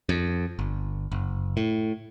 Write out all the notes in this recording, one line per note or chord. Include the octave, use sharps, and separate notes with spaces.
F2
G1
F#1
A2